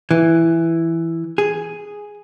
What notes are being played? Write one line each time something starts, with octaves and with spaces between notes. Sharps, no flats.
E3
G#4